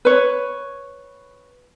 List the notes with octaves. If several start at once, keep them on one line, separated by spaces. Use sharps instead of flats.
B4 C#5